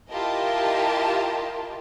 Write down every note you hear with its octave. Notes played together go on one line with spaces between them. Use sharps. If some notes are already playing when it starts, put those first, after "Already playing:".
E4 F4 G4 A#4 D#5 A5